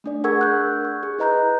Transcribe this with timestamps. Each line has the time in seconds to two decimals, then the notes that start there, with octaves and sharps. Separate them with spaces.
0.04 A3 D4 D5
0.24 G#4 A#4 F#5 C#6 E6 G#6
0.41 F#6 G6
0.85 C#6
1.03 G#4
1.18 E4 B4 D#5 A#5 F#6 G6